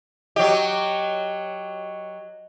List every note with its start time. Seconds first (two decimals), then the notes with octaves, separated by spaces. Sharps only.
0.36 F#3 G4 D#5